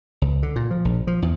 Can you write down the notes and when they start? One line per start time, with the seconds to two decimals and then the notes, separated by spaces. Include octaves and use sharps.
0.22 C#2
0.43 D3
0.56 A#2
0.71 F3
0.85 A#1
1.07 F3
1.22 E2